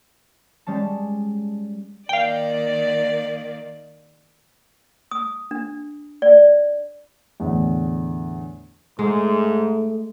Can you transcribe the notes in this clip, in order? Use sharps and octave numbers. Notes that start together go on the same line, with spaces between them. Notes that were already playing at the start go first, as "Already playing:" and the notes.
G3 G#3 C#4 A5
D#3 A#3 D5 F5 G5
D#6
D4
D5
E2 A2 D3
G#2 G#3 A3